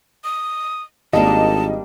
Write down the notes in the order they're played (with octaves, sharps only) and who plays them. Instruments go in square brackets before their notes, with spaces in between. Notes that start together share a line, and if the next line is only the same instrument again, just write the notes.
[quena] D#6
[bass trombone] G#1 [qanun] G3 A#3 D4 [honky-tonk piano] D#5 [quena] A5